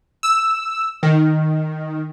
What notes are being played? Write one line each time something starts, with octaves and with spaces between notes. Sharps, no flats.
E6
D#3